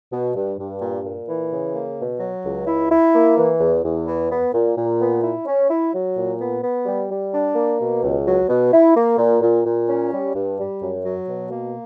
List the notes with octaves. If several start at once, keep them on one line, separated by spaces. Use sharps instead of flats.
B2
G2
G2
A#2
A#2
E3
C#3
A#3
B2
F#3
C#2
E4
E4
A#3
E3
E2
E2
E3
B3
A#2
A#2
B3
E4
C#4
E4
F#3
A#2
B3
B3
G3
G3
D4
A#3
B2
C#2
F#3
B2
E4
A#3
A#2
A#2
A#2
C#4
G3
G2
G3
F#2
F#3
B2
A#3